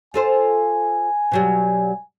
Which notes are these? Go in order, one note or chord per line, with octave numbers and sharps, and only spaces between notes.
F4 A4 C5 G#5
B2 F#3 G3